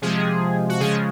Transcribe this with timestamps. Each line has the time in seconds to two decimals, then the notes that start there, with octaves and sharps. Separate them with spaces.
0.02 C3 F3 G#3 G#4
0.69 F#4
0.80 C#3 F3 G#3 G#4